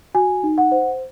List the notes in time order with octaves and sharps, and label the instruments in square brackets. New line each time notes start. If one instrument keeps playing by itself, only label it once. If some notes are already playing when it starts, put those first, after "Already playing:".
[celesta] F#4 G#5
D#4
F#5
C5